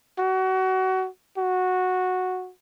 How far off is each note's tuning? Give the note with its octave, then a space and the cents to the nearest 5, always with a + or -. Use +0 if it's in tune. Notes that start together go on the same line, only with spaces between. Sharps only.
F#4 +25
F#4 -10